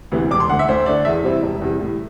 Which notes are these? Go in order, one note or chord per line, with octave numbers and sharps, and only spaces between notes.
D2 C3 E3 B3
E1 D6
C6
D2 D3 F#5
E5
D2 C5
D3 A3 D4 D5
E2 E5
C3 G3 C4 E4
E1
E2 C3 G3
A2